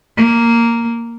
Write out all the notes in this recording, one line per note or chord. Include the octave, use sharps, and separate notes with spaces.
A#3